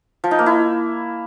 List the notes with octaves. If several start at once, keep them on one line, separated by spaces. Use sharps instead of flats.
F3
D#4
A#3
E4